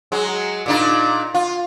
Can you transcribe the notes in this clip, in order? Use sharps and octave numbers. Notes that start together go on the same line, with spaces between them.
F#3 G#3
A#2 D4 D#4
F4